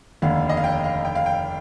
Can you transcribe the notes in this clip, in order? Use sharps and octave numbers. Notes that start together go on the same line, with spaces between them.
F1 D#2 D3 F5
D#5
F5
G5
F5
G5
F5
G5